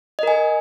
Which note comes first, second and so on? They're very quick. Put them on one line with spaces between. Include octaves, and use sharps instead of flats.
D#5 A#4 G#5